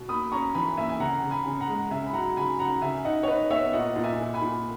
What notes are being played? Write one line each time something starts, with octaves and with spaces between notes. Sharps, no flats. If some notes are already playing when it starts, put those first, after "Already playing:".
Already playing: B2
A#3 B5 D#6
C#4 A#5 C#6
E3 G#5 B5
A#3 E5 G#5
G#5
C#3 F#5 A#5
C#3
G#5 B5
C#3
F#5 A#5
G#3
C#3 E5 G#5
B5
F#3 F#5 A#5
C#3 G#5 B5
C#3 F#5 A#5
C#3 E5 G#5
D#4 D#5 F#5
C#5
D#4 B4 D#5
B3 C#5 E5
A#2 D#5 F#5
A#2
E5 G#5
A#2
G#5 B5
A#2